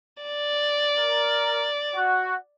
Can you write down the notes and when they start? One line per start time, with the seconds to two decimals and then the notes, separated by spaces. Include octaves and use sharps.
0.23 D5
0.98 A#4
1.95 F#4